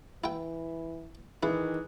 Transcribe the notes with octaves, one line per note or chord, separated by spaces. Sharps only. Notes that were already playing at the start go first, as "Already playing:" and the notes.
E3 E4 G5
D#3 E3 E4 G#4 B4